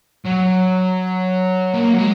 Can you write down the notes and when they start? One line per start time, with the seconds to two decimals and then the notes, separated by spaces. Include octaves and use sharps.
0.25 F#3
1.74 A#3
1.93 F#3
1.99 G#3